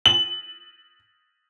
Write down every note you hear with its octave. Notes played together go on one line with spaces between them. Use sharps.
F#7